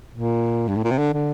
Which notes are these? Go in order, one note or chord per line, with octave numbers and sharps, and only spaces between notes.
A#2
G2
A2
A#2
C3
D3
D3